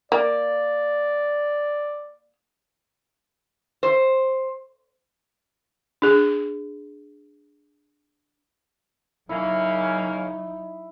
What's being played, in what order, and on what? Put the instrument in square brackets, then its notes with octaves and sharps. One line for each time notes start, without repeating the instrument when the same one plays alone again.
[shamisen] A#3 [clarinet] D5
[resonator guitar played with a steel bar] C5
[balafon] D4 G#4
[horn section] C#3 A#3 C#4 [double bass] F#3 D#4 [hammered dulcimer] E4